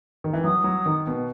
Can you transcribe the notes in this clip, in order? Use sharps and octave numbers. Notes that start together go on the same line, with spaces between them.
D#3
E3
F#3 D#6
F#3
D#3
B2